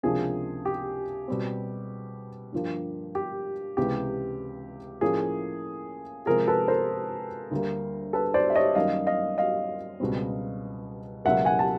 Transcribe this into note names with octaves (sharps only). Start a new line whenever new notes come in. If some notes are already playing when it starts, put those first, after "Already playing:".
C#2 C3 F3 A#3 D4 G#4
G4
B2 G3 C4
G2 D3 F3 A#3
G4
C#2 C3 E3 G#3 B3 G4
A2 F3 A#3 C#4 G#4
C3 F3 G#3 C4 G#4 A#4
A4 B4
A#4 C5
D2 D3 G3 A#3
A4 B4
C5 D5
E5
C#5 D#5
F#2 D#3 G3 A#3 C#4 D#5 F5
D#5 F5
D#5 F5
C#2 B2 G3 C4
C#2 B2 F#3 A#3 E5 F#5
F#5 G#5
A5